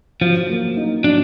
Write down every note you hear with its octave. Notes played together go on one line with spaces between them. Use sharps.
F3 F#3
A#3
D#4
F#3 D4